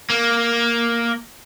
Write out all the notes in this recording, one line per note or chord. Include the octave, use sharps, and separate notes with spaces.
A#3